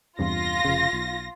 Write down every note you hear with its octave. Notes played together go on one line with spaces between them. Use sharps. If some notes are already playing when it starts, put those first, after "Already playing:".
E2 G2 C3 F4 A#6
F1 C#3
B1